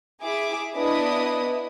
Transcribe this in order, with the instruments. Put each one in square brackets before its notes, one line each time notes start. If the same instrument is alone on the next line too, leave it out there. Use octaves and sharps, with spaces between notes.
[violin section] E4 G#4 E5 D6
B3 D4 E4 B4 D#5 D#6